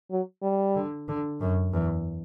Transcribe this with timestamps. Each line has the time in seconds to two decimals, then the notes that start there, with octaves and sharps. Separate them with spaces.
0.11 F#3
0.43 G3
0.76 D3
1.08 D3
1.41 F#2
1.73 E2